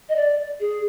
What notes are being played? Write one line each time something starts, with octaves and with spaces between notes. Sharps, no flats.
D#5
D5
G#4